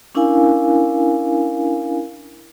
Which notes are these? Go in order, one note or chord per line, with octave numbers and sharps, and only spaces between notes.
C#4 D4 E4 A#4 F5 G#5